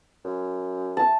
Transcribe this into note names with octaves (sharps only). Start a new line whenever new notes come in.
F#2
A5